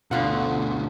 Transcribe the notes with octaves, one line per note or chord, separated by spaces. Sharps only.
D2 B2 D3 F4 F#5